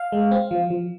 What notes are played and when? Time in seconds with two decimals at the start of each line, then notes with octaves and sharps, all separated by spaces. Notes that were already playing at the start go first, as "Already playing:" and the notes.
Already playing: F5
0.12 G#3
0.31 C4
0.51 F3
0.70 F3